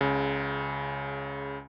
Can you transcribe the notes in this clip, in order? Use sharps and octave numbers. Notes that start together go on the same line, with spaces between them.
C#2 C#3